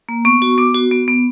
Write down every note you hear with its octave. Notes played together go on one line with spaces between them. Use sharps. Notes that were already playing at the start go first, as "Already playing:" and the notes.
A#3
B3 C#6
F#4
B3 D6
F#4
B3
B3